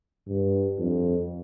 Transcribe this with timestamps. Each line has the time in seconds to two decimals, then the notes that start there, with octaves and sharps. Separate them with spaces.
0.27 G2
0.78 F2